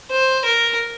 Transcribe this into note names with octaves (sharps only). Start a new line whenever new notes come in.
C5
A#4